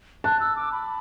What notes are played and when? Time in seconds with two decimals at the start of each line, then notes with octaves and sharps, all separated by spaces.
0.24 A5 F#6
0.40 E6
0.56 D6
0.72 B5